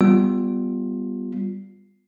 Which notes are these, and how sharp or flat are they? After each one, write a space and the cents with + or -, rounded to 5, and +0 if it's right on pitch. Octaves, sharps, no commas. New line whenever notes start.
G3 +0 B3 +0 F4 +10